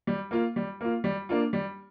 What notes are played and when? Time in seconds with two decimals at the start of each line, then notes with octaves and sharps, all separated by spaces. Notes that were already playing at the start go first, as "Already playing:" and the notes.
0.07 G3
0.31 A#3 F4
0.56 G3
0.81 A#3 F4
1.04 G3
1.29 A#3 D4 F4
1.53 G3